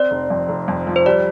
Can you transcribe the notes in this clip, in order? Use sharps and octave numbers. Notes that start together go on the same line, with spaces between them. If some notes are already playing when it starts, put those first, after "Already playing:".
Already playing: C4 D5
F1
F2
F1
F2
F3
C5
G3 D5